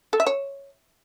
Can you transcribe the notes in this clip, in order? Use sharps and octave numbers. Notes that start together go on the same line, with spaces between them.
A4
E5
C#5